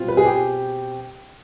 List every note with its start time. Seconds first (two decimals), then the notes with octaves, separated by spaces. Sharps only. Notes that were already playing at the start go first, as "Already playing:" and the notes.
Already playing: B2 G3 C4 F4
0.08 B4
0.17 G#4
0.25 G4